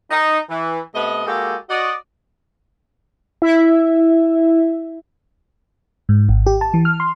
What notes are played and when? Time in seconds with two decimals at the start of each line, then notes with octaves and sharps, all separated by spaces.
0.11 D#4
0.50 E3
0.95 C3 A3 B3 D#5
1.26 G#3 A#3 F#4 G4 A4
1.70 F#4 D5 D#5
3.42 E4 E5
6.09 G#2
6.29 G#1
6.47 G4
6.61 A5
6.74 E3
6.85 F6
7.00 C6